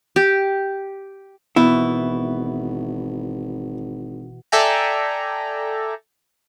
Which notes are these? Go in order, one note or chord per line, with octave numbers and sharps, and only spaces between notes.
G4
G#1 B2 E3 B3 E4
A4 D5 E5 G5 G#5 A#5